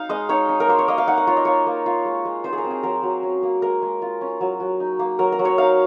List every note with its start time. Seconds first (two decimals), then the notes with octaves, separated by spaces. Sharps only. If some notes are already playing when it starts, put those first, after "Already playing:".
Already playing: D#4 F5
0.09 G#3 D#5
0.29 D#4 C#5
0.49 D#4
0.60 A#4
0.69 A#3 C5
0.79 C#5
0.88 A#3 D#5
0.98 F5
1.07 D#4 F#5
1.18 F#5
1.27 F4 C#5
1.37 D#5
1.45 A#3 C#5
1.67 A#3
1.86 F4
2.05 G#3
2.25 G#3
2.44 D#4 C5
2.53 G#4
2.58 A#4
2.65 C4
2.71 G#4
2.83 F#3 A#4
3.03 F#3
3.23 C#4
3.43 A#3
3.62 G#3 A#4
3.82 G#3
4.02 F4
4.21 C#4
4.41 F#3
4.60 F#3
4.80 D#4
4.99 A#3
5.19 F#3 A#4
5.32 A#4
5.39 F#3
5.45 C#5
5.58 D#4 F5